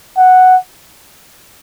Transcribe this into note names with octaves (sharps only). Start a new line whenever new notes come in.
F#5